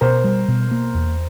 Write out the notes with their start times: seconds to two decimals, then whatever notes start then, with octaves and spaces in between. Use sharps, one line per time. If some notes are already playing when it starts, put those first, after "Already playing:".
0.01 B2 A#4 C5
0.24 G3
0.48 B2
0.71 A#3
0.95 E2